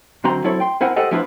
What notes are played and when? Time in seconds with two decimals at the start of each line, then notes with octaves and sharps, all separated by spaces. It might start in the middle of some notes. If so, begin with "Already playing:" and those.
0.24 F#2 D3 C4 F#4 A#5 C6
0.44 F#3 C4 E4 A4 C#5
0.60 G5 C6
0.81 C4 E4 A#4 C5 F#5 G#5
0.96 G4 A4 C5 D#5 F#5
1.11 F3 B3 D4 E4 F4 B4